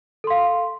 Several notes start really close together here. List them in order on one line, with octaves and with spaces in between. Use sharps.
A4 C6 F5